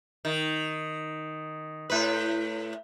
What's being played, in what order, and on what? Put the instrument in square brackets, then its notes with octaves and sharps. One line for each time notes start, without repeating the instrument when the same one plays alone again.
[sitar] D#3
A2 B4